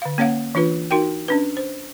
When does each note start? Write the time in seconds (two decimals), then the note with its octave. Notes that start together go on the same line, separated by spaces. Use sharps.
0.02 D3 F5
0.18 A#3 C#4 C#5 F5 F#5
0.55 E3 D4 F4 B4
0.91 D#4 F#4 A#4 G5
1.28 C#4 D4 B4
1.57 C5